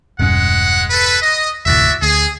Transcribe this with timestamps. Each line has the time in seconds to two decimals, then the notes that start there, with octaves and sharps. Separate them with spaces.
0.19 E1 G2 G#3 C#4 F#5
0.91 A4 B4
1.22 D#5
1.66 F1 D2 A2 F#4 D5 E5
2.02 D2 G#4